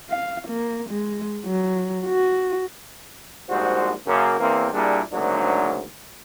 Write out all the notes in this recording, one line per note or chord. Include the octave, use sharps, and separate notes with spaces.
F5
A#3
G#3
F#3
F#4
A#1 G#2 G3 F#4 C5
F#2 C#3 A#3
E2 A#3 C4
A#2 G3 A#3 D4 E4 G#4
D2 G#2 C#3 F#3 A#3 D4